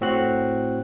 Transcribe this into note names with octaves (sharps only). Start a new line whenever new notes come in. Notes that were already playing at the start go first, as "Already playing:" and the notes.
A2 C4 F#4 F#6